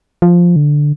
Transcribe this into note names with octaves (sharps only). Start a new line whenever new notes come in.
F3
D3